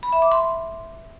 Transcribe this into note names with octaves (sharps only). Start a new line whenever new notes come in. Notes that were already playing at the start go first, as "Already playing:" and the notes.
B5
E5
D6
C6